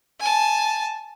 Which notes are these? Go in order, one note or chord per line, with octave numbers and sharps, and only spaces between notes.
G#5 A5